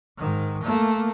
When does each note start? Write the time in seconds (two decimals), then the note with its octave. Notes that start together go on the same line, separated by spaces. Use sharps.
0.18 G#2 D#3
0.64 A3 A#3